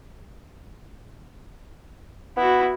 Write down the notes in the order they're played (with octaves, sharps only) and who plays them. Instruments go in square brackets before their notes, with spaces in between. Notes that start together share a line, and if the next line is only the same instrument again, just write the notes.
[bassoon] B3 [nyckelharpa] E4 F#4